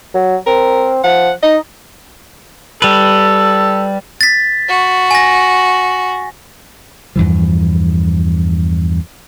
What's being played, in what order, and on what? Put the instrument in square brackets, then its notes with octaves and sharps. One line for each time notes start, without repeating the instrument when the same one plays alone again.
[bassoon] F#3
[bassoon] C4 [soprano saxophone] A#4
[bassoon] F3 [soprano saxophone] F#5
[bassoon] D#4 [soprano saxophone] D#5
[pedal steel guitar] G3 B4 [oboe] A4
[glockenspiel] A6 B6
[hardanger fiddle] F#4
[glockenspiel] G#5 A#6
[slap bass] E2 G2 E3 F3